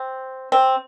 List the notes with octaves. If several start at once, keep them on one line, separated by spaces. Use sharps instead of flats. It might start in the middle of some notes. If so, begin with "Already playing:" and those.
Already playing: C4
C4